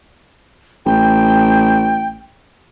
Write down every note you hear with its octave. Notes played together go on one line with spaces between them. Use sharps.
A1 G5